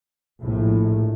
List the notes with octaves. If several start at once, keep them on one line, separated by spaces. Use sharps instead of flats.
A#1 A2